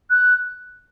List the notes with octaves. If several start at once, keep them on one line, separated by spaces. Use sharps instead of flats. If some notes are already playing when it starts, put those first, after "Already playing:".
F#6